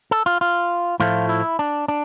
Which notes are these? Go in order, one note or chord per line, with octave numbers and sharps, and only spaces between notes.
A4
F4
F4
A2 F3 A3 F4
E4
D4
D4